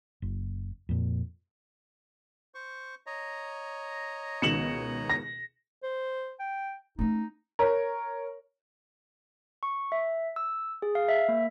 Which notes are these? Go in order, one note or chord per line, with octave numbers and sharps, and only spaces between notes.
F#1
F2 A#2
C5 C#6
C#5 D#5 A#5
C#2 B2 D#3 C#7 E7 F#7
A#6
C5
G5
A3 C#4 D#4
A#4 C#5
C#6
E5
E6
G#4
F5
E5
A#3